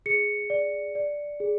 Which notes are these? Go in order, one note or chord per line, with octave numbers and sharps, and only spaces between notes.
G#4 C#7
D5
D5
G#4